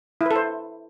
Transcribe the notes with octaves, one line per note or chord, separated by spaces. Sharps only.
E4
B4
A4
C5